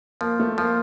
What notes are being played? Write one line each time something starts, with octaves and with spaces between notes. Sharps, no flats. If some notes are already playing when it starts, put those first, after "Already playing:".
F3 A#3
A3
F3 A#3